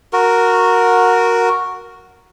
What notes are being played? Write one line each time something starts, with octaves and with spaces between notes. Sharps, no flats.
F#4 A#4